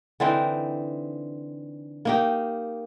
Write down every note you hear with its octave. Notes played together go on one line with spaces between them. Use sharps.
D3 E3 C4 D#4
A#3 D#4 G4